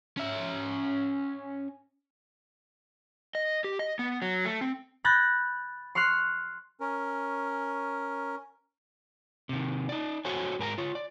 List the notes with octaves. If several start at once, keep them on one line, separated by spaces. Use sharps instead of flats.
C#4 E5
D#5
G4
D#5
B3
F#3
A3
C4
B5 F#6 G6 A6 A#6
C6 C#6 F6 F#6 C7
C#4 A#4
C3 D#3
D#4 D5
F#4 A4 C5 C#5 G#5
G#2 A#4 G#5 A#5
F4 C#5
D5